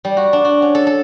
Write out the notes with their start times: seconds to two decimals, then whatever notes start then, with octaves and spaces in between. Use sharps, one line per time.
0.05 G3
0.17 F#4
0.33 D4
0.45 F#4
0.62 C#4
0.75 A4
0.87 A4